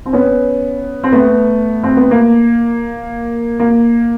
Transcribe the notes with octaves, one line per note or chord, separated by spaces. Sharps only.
C4
B3 C#4
C4
A3 B3
C4
B3
A#3
A#3